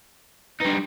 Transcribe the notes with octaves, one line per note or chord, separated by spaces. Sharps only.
G3 D4 D#4 B4